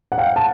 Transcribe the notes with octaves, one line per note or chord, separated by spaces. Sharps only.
F#5
F5 G5
A5